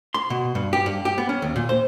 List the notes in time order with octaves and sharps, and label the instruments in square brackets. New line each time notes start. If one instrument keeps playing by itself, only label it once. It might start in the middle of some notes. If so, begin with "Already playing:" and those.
[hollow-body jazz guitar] C6
B2
G2
G4
G2
G4
B3
C#4
D#2
A#2
C5